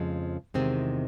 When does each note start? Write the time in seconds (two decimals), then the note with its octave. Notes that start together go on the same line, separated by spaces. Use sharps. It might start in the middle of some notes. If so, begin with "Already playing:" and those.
Already playing: F2 C#3 F3 G#3
0.54 E2 C3 D#3 G#3 C4